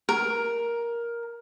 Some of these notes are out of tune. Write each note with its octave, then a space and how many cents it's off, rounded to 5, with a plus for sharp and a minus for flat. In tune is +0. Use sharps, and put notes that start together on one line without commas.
A#4 +10